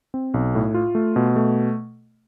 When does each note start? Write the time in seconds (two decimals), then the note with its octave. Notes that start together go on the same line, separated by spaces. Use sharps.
0.14 C4
0.34 B1
0.55 A2
0.74 F4
0.95 A3
1.16 B2
1.36 A3